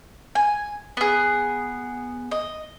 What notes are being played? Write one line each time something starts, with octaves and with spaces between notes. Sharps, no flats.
G#5
B3 G#4
D#5